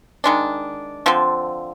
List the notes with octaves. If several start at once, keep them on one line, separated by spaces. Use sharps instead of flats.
D#3 G#3 D4
D3 F3 C4